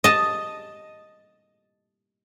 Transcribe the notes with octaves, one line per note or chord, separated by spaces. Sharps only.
D#5 A5